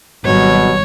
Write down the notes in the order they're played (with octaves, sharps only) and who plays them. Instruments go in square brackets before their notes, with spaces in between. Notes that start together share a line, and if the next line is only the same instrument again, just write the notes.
[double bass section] G#1 F#3 G3 [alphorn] B2 [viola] C#5